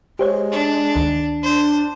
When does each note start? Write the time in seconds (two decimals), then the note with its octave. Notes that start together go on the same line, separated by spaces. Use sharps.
0.19 G#3 G4 C5 C#5
0.52 D4
0.96 D2 D#3
1.43 D4 C5